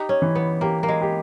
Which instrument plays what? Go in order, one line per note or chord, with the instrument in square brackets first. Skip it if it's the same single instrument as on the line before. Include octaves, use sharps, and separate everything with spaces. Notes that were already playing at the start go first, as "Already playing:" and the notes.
Already playing: [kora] D#4 [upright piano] G4
[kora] C#4
[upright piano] E3
[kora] B3
[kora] A#3 [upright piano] G4
[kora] A#3
G#3
[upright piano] G4